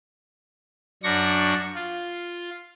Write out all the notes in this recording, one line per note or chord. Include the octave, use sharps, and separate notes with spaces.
F#2 D4 C#6 A#6
F4